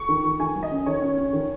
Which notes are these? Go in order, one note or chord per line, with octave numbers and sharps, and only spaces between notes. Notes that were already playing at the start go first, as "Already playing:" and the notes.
Already playing: C#6
D#3
D#3
D#3 G#5
F#3
D#5
C#4
D#3 C#5
C#4
C#4
D#3